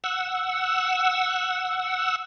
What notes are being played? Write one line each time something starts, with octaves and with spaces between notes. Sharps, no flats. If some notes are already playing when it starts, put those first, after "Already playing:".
F#5 E6